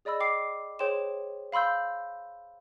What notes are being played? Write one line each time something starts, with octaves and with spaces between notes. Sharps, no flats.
G#4 D5 D#5 B5 E6
G5 D6 C7
G#4 C5 C#5 G5 C6 E7
F5 B5 C6 E6 G6